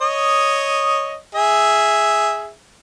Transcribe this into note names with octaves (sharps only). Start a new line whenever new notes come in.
C#5 D#5 D#6
G#4 E5